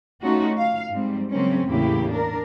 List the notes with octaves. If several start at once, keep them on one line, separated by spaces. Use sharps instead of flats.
A3 C#4 D#4 F4 F#4
F5
G#2 G3 C4
C#3 F#3 G#3 A#3 C4 C#4
E2 A2 C#3 A#3 E4 G4
D4 A#4